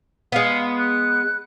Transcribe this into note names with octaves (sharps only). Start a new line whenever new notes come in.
G#3 B3 F5
F#6